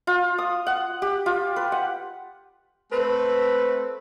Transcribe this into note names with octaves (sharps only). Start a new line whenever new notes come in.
F4
D#6
F#5
G4
F4
B4
F#5
A3 C4 A4 B4